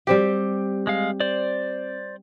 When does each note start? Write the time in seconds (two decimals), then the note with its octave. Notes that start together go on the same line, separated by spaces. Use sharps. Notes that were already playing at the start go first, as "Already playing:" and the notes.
0.07 G3 C4 G4
0.87 G#3 F5
1.20 C5 D5